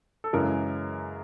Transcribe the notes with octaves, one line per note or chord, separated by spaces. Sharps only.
A4
F#2 C#3 E3 G#3 A#4